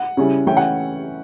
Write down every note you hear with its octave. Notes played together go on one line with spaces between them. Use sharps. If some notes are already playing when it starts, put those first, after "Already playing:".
Already playing: F#5
C#3 G3 C#4 E4
E3 A3 C#4 E4 G5
F#5